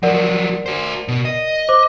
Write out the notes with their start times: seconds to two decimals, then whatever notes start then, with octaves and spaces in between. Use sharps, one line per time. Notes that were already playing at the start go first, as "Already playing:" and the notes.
0.03 F3 F#3 A#4 D5 F#5
0.66 F#4 C5
1.08 B2
1.25 D#5
1.69 C5 D6